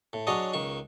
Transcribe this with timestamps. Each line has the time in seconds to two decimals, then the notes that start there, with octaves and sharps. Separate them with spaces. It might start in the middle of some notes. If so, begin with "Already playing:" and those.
0.13 A2
0.27 F#3 D4 G#4 C#5 D#5
0.53 C#2 D#3 C#6